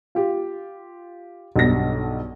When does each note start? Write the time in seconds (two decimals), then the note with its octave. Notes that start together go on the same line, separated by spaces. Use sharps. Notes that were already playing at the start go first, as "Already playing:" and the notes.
0.15 F4 G4
1.56 B1 G2 B2 A#6